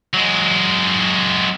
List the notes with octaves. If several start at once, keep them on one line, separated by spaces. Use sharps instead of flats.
F#3 G#3